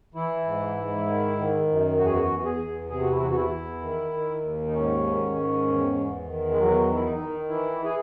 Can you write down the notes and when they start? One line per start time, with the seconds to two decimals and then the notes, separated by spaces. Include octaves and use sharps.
0.14 E3 E4
0.46 G#2
0.77 G#2
1.07 D#3
1.38 D#3
1.68 F#2
1.98 E2 F#4
2.05 G#4
2.13 F#4
2.30 E2
2.45 G#4
2.60 E2
2.90 C3 G#4
3.01 F#4
3.11 E4
3.20 E2 F#4
3.31 F#4
3.36 E4
3.51 E2
3.82 D#3
4.13 D#3
4.43 D#2
4.67 D#4
4.74 G#2 C#4
5.05 D#3
5.36 G#2
5.65 E2
5.97 E2
6.26 D#3
6.51 G#3
6.57 E2 F#3
6.88 D#3
6.95 E4
7.04 D#4
7.18 D#3
7.49 E3 E4
7.79 E3
7.84 G#4